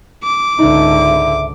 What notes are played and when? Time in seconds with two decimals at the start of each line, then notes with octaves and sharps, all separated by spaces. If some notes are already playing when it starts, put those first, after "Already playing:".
0.23 D6
0.59 C#2 G#2 D3 D#4 E5